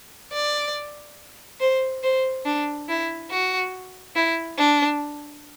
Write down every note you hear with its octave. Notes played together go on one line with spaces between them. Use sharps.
D5
C5
C5
D4
E4
F#4
E4
D4